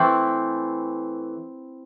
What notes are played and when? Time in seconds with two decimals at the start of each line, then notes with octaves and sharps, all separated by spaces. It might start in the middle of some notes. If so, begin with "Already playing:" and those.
Already playing: E3 A3 C4 E4